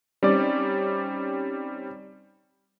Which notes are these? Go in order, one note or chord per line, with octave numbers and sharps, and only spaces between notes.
G3 C4 C#4 D#4 D5